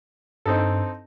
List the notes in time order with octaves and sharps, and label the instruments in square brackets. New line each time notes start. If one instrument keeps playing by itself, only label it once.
[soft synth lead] G2 [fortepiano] C4 D#4 A4